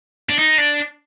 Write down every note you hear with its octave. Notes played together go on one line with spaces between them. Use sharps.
D4
D#4
D4